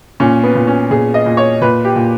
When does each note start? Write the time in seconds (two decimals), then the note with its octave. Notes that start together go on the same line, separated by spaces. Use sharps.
0.20 A#2 C#4
0.43 B3
0.55 A#2
0.67 C#4
0.91 A#2 G#4
1.14 D#5
1.26 A#2
1.37 C#5
1.61 A#2 B4
1.85 G4
1.96 A#2